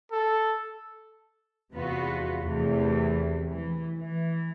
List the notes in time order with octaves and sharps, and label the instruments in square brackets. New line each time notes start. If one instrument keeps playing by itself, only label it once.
[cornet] A4
[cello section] E2 C3 B3 F4 F#4 B4
E2 C3 E3 A3
E3
E3